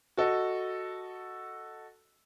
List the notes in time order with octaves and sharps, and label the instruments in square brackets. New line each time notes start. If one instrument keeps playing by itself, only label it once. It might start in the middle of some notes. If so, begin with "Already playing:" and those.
[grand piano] F#4 A4 D#5